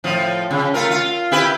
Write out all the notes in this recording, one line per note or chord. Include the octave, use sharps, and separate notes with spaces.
A2 F3
C#3
A3 F4 A#4
F4
E4 G4 B4